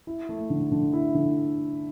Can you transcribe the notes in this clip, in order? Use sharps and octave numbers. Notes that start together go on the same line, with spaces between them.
E4
A3
D3
D3
E4
D3